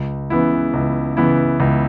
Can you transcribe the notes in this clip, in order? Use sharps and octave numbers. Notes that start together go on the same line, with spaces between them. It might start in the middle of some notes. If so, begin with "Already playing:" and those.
Already playing: C#2
C#3 E3 B3 E4
C#2
C#3 E3 B3 E4
C#2